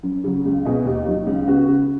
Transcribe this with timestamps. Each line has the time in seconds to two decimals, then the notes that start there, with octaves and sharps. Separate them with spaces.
0.03 F#2
0.24 C#3 F#3
0.45 C#2
0.65 B2 B3 G#4 D#5
0.86 D#2
1.07 D#3 F#3 D#4
1.26 C#2
1.47 C#3 B3 F#4
1.68 C#3